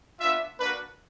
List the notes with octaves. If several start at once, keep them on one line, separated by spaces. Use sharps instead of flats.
B3 D4 F4 E5
A#3 D4 F#4 B4